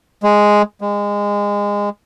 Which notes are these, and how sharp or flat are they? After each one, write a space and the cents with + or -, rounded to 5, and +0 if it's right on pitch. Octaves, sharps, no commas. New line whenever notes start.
G#3 +0
G#3 -25